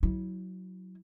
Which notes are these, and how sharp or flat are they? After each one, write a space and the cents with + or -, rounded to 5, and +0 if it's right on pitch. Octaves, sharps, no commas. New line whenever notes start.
F#3 +0 E4 -30